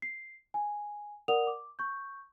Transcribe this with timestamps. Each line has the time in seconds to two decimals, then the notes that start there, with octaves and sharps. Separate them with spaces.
0.02 C7
0.54 G#5
1.28 A#4 D5 F#5 D#6 F7
1.47 D6
1.79 C#6 G6